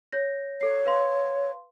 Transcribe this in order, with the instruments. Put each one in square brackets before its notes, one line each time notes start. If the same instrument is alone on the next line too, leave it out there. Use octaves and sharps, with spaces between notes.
[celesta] C#5 G6 A#6
[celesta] A4 C7 [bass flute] C#5
[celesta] B4 F5 C6